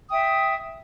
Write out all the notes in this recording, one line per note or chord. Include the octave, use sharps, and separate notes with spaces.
E5 G5 D#6